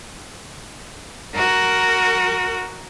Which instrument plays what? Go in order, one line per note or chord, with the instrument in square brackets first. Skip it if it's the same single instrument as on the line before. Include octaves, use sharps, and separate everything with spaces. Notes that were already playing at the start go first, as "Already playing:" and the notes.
[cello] F#4 A#4